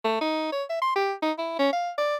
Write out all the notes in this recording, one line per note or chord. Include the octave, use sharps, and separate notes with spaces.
A3
D#4
C#5
E5
C6
G4
D#4
E4
C#4
F5
D5